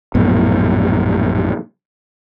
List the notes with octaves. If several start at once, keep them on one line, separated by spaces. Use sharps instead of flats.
A#1 F#2 A2 B3